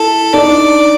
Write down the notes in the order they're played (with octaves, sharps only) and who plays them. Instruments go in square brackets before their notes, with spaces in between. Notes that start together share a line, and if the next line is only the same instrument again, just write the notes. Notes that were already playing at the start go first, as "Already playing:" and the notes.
Already playing: [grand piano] E4 [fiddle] A4
[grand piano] D#4 [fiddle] D5
[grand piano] D4